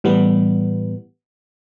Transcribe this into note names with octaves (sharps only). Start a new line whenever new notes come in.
A2 E3 G3 B3